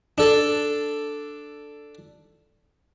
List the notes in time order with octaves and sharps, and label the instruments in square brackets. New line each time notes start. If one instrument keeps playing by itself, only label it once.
[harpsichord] D4 A4